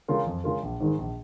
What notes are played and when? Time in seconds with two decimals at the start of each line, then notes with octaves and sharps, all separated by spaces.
0.08 C#3 G#3 F4 A#4
0.26 F2
0.44 C#3 G#3 F4 A#4
0.62 A#1
0.80 G#2 D#3 G#3
0.98 A#1